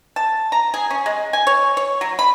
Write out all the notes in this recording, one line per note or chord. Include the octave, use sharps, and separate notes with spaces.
A5
A#5
G#4
C#4
G#3
G#5
C#5
C#5
F#3
B5